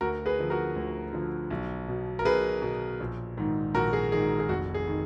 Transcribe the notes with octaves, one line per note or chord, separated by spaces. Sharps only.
D2 F#4 A#4
G#4 B4
D3 F3
F#4 A#4
D2
D3 F3
B1
B2
A#4
B1 G#4 B4
B2
A#1
G#2 D#3
A#1 F#4 A#4
G#4
G#2 D#3 G#4
G#4
F1 F#4
G#4
D#3